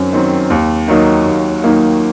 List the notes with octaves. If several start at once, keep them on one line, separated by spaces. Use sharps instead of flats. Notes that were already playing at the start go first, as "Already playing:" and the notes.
Already playing: F#2 D#3 F#3 C4
D#3 F#3 C4
D#2
D#3 F#3 A#3 D#4
D#2
D#3 F#3 A#3 D#4